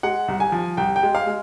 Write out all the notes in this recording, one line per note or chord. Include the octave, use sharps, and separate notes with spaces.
G#3 F#5
C2
G#5
F3
C2 G5
G5
G#3
F5
G#3